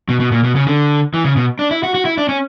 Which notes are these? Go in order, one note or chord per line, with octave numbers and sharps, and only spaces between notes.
B2
B2
A#2
B2
C#3
D3
E3
C#3
B2
D4
E4
F#4
F#4
E4
D4
C#4